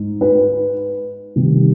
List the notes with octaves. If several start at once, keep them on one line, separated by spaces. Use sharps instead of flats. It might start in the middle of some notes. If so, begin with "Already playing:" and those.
Already playing: G#2
B4
C3 D#3 G3